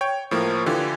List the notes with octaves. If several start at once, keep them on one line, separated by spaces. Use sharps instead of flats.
C#5 G5
A2 F3 A#3
D3 E3 F4 G4